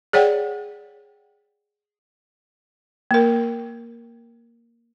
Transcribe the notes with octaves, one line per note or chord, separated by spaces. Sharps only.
G#4 C#5 D5 F#5 G5
A#3 A#4